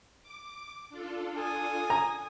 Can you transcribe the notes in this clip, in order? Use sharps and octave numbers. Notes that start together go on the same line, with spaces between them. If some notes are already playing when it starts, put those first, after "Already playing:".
D6
D4 F4 A4
G#5 D#6
A#5